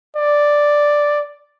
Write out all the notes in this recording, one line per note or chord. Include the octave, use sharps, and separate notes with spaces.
D5